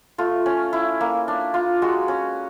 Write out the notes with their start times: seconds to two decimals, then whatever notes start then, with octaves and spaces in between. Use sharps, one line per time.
0.18 A3 F4
0.46 C#4
0.73 E4
1.01 A#3
1.28 D4
1.54 F4
1.82 G#3 F#4
2.08 C#4